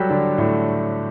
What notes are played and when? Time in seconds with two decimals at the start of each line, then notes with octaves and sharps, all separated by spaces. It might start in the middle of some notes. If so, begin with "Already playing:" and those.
Already playing: F#3 G3 F#4 G4 A4
0.10 D3 D4
0.38 A2 A3